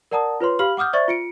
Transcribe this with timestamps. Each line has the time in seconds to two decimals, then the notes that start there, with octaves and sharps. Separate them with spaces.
0.11 A#4 D5 F#5 A5 A#5 D#6
0.40 F4 B4 C#5 C6
0.59 G4 F5 B5 F6 F#7
0.77 F#5 D6 D#6 F6 G6
0.93 C5 D5 E5 C#6 A6
1.08 F4 C#7 D7